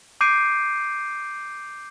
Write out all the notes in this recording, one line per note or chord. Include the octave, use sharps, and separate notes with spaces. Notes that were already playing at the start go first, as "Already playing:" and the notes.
D6 G6 C7 D7 D#7